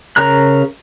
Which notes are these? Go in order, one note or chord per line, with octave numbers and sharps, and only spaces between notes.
C#3 A#4 A#5 F#6